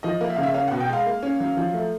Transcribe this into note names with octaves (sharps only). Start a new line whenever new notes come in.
F3 D#5
A#3
E5
C#3 F5
E5
C#4 F5
B2 F#5
G5
G#3 F5
A#3
C#4
F#3
F3
A3